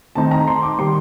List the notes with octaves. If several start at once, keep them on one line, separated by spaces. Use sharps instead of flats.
D#3 A3 C4 D#4 A5
A#5
C6
D6
D#3 G3 A#3 C6